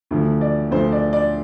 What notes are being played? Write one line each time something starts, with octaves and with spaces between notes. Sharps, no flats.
D2 D3 F3
D5
D2 D3 F3 C5
D5
D5